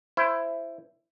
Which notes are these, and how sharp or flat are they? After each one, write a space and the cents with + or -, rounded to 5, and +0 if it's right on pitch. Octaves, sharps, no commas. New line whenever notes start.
E4 +15 C5 +0